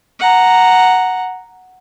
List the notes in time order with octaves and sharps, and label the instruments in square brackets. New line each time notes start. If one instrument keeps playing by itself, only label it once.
[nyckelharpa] F#5 A#5